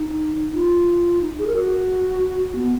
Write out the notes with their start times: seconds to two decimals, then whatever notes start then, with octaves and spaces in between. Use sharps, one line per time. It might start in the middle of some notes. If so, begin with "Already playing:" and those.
Already playing: D#4
0.54 F4
1.21 D#4
1.39 G#4
1.47 A#4
1.55 F#4
2.55 B3